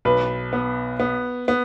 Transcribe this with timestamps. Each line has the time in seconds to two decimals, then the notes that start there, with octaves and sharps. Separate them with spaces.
0.05 B1 B4
0.53 B3
1.00 B3
1.48 B3